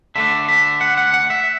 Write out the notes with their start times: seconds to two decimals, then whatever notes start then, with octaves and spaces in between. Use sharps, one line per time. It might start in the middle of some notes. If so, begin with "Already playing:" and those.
0.16 D3 A3 D4 E5
0.49 E5
0.81 F#5
0.98 F#5
1.14 F#5
1.30 E5